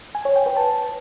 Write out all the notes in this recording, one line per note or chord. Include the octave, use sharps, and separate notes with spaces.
G#5
C#5
G5
B4
A5